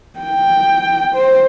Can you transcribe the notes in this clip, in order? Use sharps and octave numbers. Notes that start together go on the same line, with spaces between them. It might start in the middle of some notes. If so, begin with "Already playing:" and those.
G5
C5